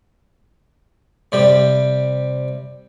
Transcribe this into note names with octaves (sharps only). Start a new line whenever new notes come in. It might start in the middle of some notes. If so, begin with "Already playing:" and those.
C3 G3